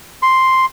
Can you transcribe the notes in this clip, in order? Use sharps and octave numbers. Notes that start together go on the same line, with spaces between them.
C6